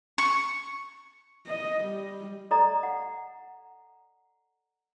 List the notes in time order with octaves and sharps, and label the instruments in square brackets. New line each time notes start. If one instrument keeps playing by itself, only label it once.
[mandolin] C#6
[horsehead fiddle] D#5
G3
[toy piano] A4 D5 D#5 A#5
F#5